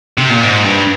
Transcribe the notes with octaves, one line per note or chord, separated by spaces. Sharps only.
C3
A#2
G#2
G2